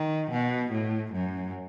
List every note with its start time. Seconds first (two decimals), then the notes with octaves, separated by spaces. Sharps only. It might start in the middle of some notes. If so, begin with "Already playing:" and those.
Already playing: D#3
0.31 B2
0.72 A2
1.13 F#2